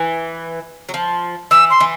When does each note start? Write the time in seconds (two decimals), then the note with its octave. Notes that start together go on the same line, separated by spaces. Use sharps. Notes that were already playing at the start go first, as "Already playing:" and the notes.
Already playing: E3
0.89 F#3
0.94 F3
1.51 E3 E6
1.71 C6
1.80 E3